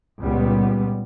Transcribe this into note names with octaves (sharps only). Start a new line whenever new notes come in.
C#2 A#2 G3 B3